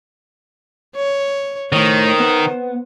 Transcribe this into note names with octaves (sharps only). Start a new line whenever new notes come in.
C#5
A2 D#3 C5 C#5
B3